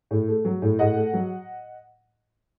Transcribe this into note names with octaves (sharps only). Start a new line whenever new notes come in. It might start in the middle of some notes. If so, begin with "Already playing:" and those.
A2
A3
F#3
A2
A2 D#5 F#5
A3
F#3